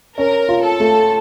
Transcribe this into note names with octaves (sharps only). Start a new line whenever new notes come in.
C#4 A#4
F4
A4
A3